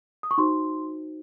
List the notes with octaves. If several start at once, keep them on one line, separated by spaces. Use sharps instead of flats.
D#6
C#6
D#4 F#4 C5 C6